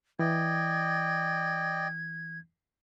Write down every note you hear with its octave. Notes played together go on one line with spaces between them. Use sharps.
E3 D5 D#5 G5 G#6